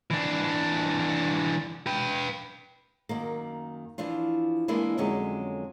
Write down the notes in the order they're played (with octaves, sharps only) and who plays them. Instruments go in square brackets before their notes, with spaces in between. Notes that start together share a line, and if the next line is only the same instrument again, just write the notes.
[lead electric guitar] E3 D4
B4 G5
[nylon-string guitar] F#2 D#3 A#3
E3 F3 D4 F4
E3 G#3 A#3 B3 D4 E4
F2 D3 F#3 G#3 C#4 C#5